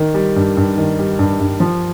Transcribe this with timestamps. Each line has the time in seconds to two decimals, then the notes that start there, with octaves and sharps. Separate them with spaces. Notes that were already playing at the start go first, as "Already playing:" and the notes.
Already playing: D#3
0.14 G3
0.36 G2
0.57 G2
0.77 D#3
0.99 G3
1.19 G2
1.40 G2
1.60 F3